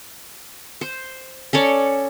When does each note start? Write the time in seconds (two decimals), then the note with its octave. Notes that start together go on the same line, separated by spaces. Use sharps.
0.81 C5
1.53 C#4 A4 C#5 D5